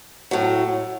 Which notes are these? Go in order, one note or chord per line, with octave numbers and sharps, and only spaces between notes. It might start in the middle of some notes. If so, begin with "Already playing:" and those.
A2 F#3